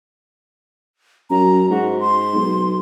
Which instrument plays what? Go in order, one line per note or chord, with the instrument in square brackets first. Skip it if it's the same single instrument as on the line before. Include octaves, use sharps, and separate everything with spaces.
[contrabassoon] F#2 [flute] A#5
[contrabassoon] G#2 [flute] F#4
[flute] C6
[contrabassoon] B1